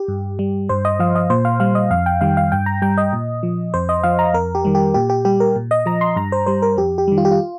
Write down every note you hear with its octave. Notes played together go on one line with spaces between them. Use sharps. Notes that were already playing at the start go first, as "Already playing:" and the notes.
Already playing: G4
G2
G3
G2 C5
D#5
F3 F5
D#5
A#2 C5
F5
G3 F5
D#5
F2 F5
G5
D#3 G3 F5
F5
G2 G5
A#5
G3 G5
D#5
A#2
F3
F2 C5
D#5
F3 F5
A#5
F2 A#4
G4
D#3 G3
G4
A#2 G4
G4
G3 G4
A#4
A#2
D#5
F3 A#5
C6
G2 A#5
C5
G3 C5
A#4
F2 G4
G4
D#3 G3
F4
G4
F4